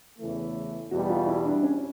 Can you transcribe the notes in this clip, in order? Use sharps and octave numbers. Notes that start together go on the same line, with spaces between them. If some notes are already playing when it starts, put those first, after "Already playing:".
E2 C#3 E3 A3
E2 B2 G3 F#4
F4
E4
D4
C#4